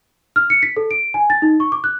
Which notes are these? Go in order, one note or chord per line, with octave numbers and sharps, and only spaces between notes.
F6
C#7
B6
A4
D7
G#5
A6
D#4
C#6
D6
F#6